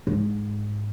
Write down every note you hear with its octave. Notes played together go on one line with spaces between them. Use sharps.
G#2